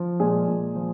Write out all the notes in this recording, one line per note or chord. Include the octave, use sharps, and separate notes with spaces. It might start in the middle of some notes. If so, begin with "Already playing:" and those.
Already playing: F3
A#2 G#3 G#4
A#2
F3